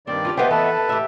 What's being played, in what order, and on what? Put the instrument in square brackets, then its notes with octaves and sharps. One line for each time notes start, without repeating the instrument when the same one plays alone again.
[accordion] G2 D#3 D5 [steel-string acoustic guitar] C4
[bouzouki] C#4 D4 G4 [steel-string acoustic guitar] F4
[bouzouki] A3 B3 D#5 [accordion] G4 C5 [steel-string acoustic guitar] B4 F5 G5
[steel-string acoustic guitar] E3 A5 [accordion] A4 B4
[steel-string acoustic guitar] A2 [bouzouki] G4 E5